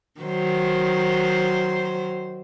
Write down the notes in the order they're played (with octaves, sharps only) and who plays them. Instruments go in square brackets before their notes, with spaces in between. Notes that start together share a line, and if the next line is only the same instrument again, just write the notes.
[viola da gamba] D#3 F#3 C5